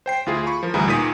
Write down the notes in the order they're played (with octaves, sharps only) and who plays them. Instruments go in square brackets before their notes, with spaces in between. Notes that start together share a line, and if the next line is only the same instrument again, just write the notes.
[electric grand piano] C5 G5 C7
D2 E4 F4 G#4
B5 C#6
F3 A#4
D2 E3 G3 G#4 A#5 B5
A#2 D#3 G#5 D#6 B6 D#7